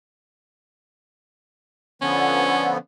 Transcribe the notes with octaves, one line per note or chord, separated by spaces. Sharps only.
D3 F3 B3 C#4